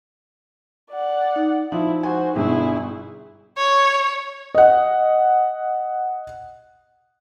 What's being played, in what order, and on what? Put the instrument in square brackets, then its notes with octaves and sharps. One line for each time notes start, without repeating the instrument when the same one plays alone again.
[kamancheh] D5 F#5
[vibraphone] D#4
[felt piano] F3 [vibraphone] D#4 [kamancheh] E4
[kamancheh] F#4 C5 [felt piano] G#5
[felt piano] G1 B2 [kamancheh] E4 G#4
[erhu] C#5
[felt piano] D#5 F#5